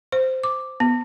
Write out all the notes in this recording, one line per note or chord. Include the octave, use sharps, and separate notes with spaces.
C5
D6
B3